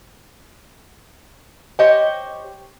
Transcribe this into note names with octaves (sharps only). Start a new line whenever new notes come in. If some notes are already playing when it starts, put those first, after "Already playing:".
G4 C5 C#5 D#5 G5